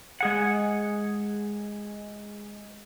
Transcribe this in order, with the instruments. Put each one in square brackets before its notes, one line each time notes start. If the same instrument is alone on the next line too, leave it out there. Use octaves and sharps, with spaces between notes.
[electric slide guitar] G#3 G#4 F#5